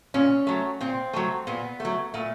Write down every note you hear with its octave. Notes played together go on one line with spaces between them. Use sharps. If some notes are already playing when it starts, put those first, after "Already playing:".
A#2 C#4
F#3 A3
A#2 C4
F#3 A3
A#2 B3
F#3 A3
A#2 A3